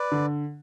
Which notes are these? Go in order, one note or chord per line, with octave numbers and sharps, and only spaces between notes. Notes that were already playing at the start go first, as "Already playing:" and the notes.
Already playing: B4 D5
D3